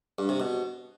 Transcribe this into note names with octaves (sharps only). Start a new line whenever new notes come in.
G2
C3
B2